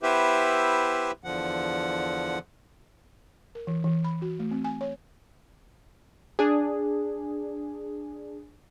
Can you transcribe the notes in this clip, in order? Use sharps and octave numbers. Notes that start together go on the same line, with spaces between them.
B3 E4 G4 B4 C5 E5
E2 D3 F3 F#5
A#4
E3
E3
B5
F#4
A3
C4
G#5
C#5
D4 G#4